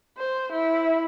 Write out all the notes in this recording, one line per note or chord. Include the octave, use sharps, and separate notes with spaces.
C5
E4